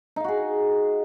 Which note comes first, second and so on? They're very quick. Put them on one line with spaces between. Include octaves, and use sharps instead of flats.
D#4 F5 F#4 G#4